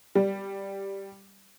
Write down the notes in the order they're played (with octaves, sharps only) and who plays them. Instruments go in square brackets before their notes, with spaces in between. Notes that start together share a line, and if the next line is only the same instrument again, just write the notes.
[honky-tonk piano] G3